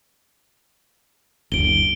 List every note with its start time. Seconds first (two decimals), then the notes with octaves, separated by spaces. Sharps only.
1.52 F#1 D2 D7 G7